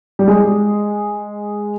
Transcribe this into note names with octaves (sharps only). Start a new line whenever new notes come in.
G3
G#3